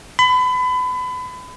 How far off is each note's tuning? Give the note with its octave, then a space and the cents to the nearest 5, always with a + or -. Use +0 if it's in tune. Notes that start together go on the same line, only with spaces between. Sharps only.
B5 +30